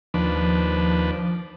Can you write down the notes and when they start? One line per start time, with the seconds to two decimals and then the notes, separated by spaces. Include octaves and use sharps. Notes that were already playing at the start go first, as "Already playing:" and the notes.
0.14 D#2 F3 D4 B4